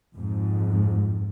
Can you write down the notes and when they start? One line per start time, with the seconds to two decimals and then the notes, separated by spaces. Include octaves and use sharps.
0.13 F2 G#2